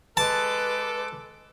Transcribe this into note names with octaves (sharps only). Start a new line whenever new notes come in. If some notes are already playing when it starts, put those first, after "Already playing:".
G#3 A4 B4 A5 D6